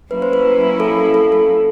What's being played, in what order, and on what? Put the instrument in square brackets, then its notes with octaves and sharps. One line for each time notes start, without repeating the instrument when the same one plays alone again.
[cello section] F#3 A#3 C#4 E4 [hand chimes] B4
[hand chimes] C5
B4
A4
A4
A4